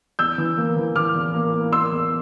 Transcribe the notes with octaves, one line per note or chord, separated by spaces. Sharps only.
E2 E6 G6
E3
A#3
E3
E3 D6 F6
E2
A#3
A#3
A#3 C6 E6
E2